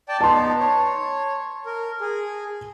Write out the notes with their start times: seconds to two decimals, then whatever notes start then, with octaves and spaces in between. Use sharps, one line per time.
0.09 D5 G5 A5
0.21 B3 D#4 A5 C6
0.60 C#5
1.66 A#4
2.01 G#4